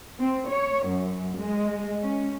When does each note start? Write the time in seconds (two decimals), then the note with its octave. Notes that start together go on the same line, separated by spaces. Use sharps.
0.20 C4
0.50 C#5
0.87 F#2
1.38 G#3
2.03 C#4